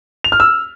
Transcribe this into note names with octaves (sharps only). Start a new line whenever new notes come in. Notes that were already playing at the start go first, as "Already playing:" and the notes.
F7
F6
E6